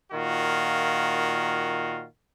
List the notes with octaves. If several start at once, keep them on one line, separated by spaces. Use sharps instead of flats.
A#2 D#3 F4 F#4